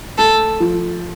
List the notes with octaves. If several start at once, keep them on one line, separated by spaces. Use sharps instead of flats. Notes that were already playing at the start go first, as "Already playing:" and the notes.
A3 A4
F3